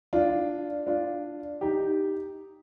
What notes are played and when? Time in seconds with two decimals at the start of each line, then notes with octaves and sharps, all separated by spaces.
0.13 D4 F4
0.87 D4 F4
1.61 D#4 G4